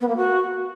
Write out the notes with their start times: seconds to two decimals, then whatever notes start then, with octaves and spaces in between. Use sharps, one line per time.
0.01 B3
0.09 A#3
0.17 F#4